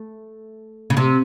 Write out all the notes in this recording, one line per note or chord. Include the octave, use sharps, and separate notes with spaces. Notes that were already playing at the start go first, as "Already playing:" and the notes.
Already playing: A3
C#3
C3